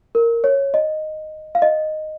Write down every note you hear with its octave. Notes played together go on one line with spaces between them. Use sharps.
A#4
C#5
D#5
F5
D#5